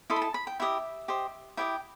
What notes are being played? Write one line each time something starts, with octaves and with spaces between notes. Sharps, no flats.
E4 A4 D#5 C6
B5
A5
B5
G5
E4 G4 D#5 E5
G4 C5 D#5
E4 G4 D#5 G5